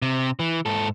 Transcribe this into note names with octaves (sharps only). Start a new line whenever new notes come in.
C3
E3
G#2 A4